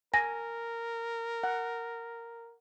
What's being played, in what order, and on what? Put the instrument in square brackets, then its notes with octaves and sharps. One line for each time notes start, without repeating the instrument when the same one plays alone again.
[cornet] A#4 [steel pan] G#5 [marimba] A#6
[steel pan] F#5